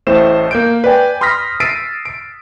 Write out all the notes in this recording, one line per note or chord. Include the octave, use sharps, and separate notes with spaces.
A1 A2 A3 C5 E7
A#3 G6 D7
B4 D5 G5 G#5
B5 C6 D#6 F6 A#6 B6
E6 A6 B6 C7 D7 D#7
D7